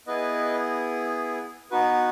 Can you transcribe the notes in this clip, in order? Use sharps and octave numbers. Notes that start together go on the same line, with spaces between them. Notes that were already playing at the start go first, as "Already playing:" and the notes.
B3 E4 G#4 B4 D#5
B3 D#4 F#4 B4